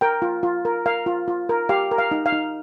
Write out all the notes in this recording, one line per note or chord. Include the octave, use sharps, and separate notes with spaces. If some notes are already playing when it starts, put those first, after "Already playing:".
A#4 G5
F4
F4
A#4
A#4 F5
F4
F4
A#4
G4 F5
A#4
F5
D#4
F5
D#4